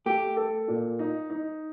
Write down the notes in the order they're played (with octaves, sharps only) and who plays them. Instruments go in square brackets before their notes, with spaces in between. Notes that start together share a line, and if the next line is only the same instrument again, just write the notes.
[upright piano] A3 [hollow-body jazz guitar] G4
[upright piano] A4
A#2
D#4
D#4